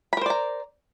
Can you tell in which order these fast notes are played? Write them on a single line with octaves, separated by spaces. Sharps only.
B5 A#4 C5 D5 A#5